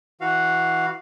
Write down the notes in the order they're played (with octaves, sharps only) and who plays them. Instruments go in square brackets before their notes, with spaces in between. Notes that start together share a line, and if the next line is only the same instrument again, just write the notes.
[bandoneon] E3 F#4 F5